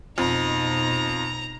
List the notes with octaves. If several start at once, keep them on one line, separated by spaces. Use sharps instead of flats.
F2 B2 D#4 A#5